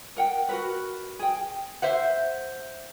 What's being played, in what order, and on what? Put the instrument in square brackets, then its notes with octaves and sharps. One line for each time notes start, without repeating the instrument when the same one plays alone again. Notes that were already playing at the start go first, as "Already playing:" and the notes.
[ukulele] A#4 F#5 G5
F#4 A#4 B4
G#4 G5
[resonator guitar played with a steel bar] C5 E5 F#5